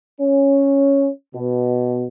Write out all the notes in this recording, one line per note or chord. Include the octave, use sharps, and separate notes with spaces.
C#4
B2